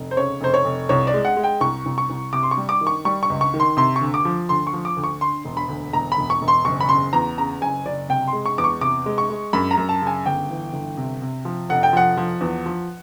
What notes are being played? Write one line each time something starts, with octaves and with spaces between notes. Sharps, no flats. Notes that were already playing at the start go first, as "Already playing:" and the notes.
Already playing: F1
C5
C#3 C#5
F1 C5
C#5
F1
C2 C#5
D5
G#3
F#5
G#3
G5
C2 C#6
C2
C#6
C2
C3 D6
C6
C#6
G3
D6
D#3
C#6
G3 C#6
C#6
C#2
C#6
D#3
C6
C3 C6
C#6
D2
D6
F3
D2 C6
C#6
F3
D6
D2
C#6
D3 C6
E1
B5
D2
E1 A#5
B5
E1
C#6
E1
C6
F#1 C#6
B5
C#3 C6
E2 A#5
C#3 A#5
F#1 G#5
F#1 D5
C3 G5
C6
G#3
C#6
E2 D6
C#6
C3 D6
G#3
C#6
G#3
F#2 B5
A#5
F#2
A5
C#3 G#5
G1 G5
E3
G1
C3
C3
F3
F1 F#5
G5
F3 F#5
F3
E2
F3